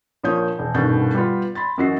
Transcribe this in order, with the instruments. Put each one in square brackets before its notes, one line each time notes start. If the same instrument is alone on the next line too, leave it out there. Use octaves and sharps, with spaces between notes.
[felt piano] A#1 F3 A#3 C#5 D#6 G6
E1
D#1 G2 B2 D#3 G6 A6
G3 B3 F4
B5 C6 A6
F#2 E3 F#4 D#5 C7